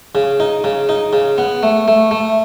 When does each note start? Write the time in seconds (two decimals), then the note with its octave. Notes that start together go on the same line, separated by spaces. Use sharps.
0.15 C#3
0.40 D#4
0.64 C#3
0.89 D#4
1.13 C#3
1.38 B3
1.63 A3
1.88 A3
2.11 A3